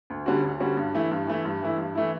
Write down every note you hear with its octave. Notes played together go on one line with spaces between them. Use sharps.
D2
D3 G3 C#4 F#4
D2
D3 G3 C#4 F#4
G2
E3 A3 E4
G2
E3 A3 E4
G2
E3 A3 E4
G2
E3 A3 E4